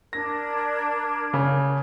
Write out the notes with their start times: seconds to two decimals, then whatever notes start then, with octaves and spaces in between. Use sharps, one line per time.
0.13 D4 A#4 G#6 A#6
1.33 C#3